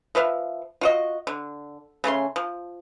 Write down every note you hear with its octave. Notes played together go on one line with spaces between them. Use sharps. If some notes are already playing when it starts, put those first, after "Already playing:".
F3 B4 E5 F5
F4 F#4 D#5
D3
C#3 A3 C#4 C6
F3